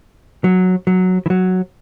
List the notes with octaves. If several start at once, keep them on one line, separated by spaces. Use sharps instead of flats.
F#3
F#3
E3
F#3